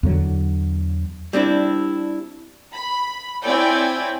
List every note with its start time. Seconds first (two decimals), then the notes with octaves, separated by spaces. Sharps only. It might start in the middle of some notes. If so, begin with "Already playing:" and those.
0.03 E2 D3 F#3
1.33 G3 C4 D4 E4
2.74 B5
3.45 C4 E4 C#5 D5 G5 G#5